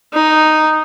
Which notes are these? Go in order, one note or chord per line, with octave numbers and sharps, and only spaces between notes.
D#4